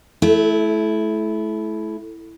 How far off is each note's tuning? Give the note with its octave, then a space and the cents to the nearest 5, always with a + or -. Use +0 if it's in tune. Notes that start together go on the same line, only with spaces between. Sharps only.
A3 -30 E4 +0